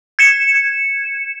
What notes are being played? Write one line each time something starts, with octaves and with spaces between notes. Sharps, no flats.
G#6 C#7 E7